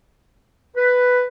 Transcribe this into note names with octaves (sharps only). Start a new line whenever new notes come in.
B4